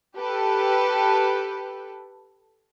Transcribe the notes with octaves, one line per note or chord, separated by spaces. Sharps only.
G4 A4 B4